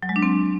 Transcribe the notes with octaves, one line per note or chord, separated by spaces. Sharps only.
F#3
G#3
D4
C4